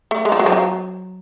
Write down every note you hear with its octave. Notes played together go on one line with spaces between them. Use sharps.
A3
G#3
F3
F#3
F3
F#3